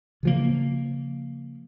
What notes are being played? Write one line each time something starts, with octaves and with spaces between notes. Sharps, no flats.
C#3 F3 A#3